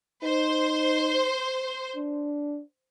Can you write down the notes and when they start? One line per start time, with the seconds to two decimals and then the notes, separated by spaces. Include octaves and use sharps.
0.23 D#4 C5
1.96 D4